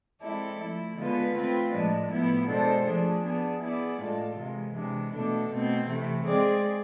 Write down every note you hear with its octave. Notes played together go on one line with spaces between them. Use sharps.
G#3 C4 E4 A4 D5
F3 A3 E4
D3 G#3 B3 F4 B4
A3 C4 F4 B4
A2 F3 G#3 D4
A2 F3 B3 E4
B2 G#3 D4 A4 C5
F3 A3 D4 G#4
B3 D4 G#4
B3 E4 G#4 D5
A2 G#3 D4 F4 A4
C3 E3 G#3
C3 E3 G#3 D4
B2 A3 D4 A4
B2 A3 C4
C3 E3 A3
G#3 C4 G#4 D5